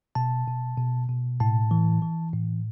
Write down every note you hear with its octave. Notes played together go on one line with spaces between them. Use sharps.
B2 A5
B2
B2
B2
A2 A5
E3
E3
A2